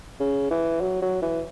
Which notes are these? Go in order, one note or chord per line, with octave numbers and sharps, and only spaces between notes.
C#3
E3
F#3
F#3
E3